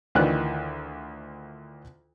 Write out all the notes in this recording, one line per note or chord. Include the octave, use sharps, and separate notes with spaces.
D2 D#3 E3 F4 D5 F#6